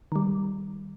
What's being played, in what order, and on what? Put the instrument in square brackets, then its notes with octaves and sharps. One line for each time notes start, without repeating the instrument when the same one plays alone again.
[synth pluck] D#3 G3